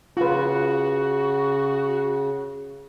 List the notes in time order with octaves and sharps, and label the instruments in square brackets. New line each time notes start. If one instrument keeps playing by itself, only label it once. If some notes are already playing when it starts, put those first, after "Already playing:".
[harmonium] C#3 [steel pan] F4 B4 [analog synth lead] F#4